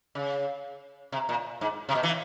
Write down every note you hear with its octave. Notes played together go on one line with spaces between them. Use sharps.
C#3
C3
A#2
G#2
C3
B2
E3